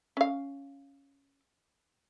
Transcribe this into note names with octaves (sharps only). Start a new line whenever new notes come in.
C#4 F5